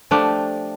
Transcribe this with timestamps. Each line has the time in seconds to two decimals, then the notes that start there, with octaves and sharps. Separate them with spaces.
0.11 F3 A3 D4 G4